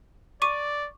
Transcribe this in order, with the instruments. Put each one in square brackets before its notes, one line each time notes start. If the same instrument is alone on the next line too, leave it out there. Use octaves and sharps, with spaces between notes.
[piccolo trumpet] D5 [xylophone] C#6 D6 D#7